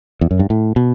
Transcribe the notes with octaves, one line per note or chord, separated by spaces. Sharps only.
E2
F#2
G2
A2
B2